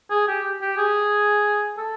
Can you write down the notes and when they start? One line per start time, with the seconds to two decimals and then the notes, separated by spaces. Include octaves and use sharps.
0.10 G#4
0.28 G4
0.61 G4
0.77 G#4
1.77 A4